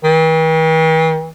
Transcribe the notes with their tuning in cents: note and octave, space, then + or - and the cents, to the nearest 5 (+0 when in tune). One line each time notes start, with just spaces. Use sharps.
E3 -45